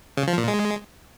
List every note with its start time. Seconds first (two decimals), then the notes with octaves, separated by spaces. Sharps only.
0.17 C#3
0.28 F3
0.38 A#2
0.48 G#3